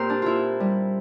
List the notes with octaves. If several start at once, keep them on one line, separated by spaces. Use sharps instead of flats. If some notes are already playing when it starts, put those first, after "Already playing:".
Already playing: A#2 C4 G4 A#4 C5
D4
A#2 E4 F4
G3